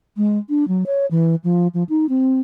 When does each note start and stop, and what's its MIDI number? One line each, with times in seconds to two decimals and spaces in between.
0.17 0.38 56
0.49 0.67 62
0.68 0.84 54
0.86 1.06 73
1.11 1.35 52
1.44 1.68 53
1.74 1.84 53
1.89 2.06 63
2.09 2.40 60